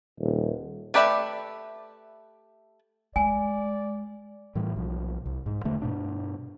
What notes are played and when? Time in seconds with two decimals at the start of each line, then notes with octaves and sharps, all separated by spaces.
0.20 D#1
0.94 A3 G4 B4 D5 E5
3.16 G#3 D5 G#5
4.55 A2 E3 G3
4.76 B1 F3
5.26 C2
5.46 G#2
5.64 E1 D3 A3
5.82 G2 B2 D4